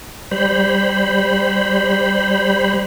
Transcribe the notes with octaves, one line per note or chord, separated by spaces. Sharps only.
G3 C5 B5